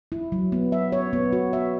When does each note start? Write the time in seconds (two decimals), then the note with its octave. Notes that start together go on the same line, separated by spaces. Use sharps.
0.12 E4
0.32 F#3
0.52 B3
0.72 E5
0.92 C#5
1.13 B3
1.33 F#4
1.53 E5